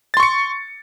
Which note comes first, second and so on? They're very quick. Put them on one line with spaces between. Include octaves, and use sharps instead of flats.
A6 C6 C#6 C#7